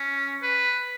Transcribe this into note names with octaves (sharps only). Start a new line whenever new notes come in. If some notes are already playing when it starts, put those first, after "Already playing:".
Already playing: C#4
B4